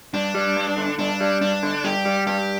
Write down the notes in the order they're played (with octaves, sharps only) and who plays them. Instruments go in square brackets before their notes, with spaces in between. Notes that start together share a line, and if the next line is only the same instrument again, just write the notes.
[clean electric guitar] G2 [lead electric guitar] D4
[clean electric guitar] G3
G2
D3
[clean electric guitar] G2 [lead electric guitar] D4
[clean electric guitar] G3
[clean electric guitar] G2 [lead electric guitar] D4
[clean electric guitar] D3
[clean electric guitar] G2 [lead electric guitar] G4
[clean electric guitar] G3
[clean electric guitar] G2 [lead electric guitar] G4